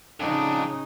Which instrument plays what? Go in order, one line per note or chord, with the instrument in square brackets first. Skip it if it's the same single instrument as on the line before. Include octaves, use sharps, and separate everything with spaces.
[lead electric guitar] F2 D4 [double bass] C#3 D#4